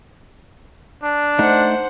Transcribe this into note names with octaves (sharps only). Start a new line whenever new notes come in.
D4
A3 D#4 C5 F#5